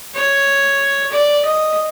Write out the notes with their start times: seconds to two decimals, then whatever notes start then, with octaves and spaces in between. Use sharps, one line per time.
0.14 C#5
1.12 D5
1.45 D#5